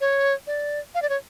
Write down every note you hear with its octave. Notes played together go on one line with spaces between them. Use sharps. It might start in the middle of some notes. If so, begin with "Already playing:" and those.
C#5
D5
F5
D5
C#5